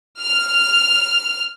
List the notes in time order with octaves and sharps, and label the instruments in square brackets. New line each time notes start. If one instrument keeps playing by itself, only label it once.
[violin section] F6